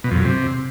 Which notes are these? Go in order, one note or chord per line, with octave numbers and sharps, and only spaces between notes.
B2
F2
F#2
C3